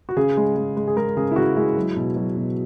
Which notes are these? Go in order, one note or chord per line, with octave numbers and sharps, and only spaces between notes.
F#4
C#3 G#4
G#3
G#3
G#3
G#4
G#3 A#4
C#3 G#4
E4
C#3 F#4
G#3 E4
F#3
B2
F#3
B2